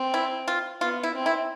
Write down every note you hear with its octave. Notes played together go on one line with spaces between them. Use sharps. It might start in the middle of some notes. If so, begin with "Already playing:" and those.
Already playing: C4
E4
F4
B3 F4
E4
C4
E4